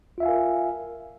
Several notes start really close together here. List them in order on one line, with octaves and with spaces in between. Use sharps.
F4 E5 F5 G#5 A#4